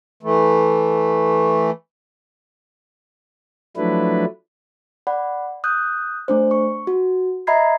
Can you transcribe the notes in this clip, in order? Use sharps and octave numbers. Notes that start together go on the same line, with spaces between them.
E3 A3
F3 F#3 A3 D4 E4 B4
D5 F#5 B5
D#6 F#6 G6
A3 D4 C5
C#6
F#4
D#5 E5 A#5 B5 G#6 C7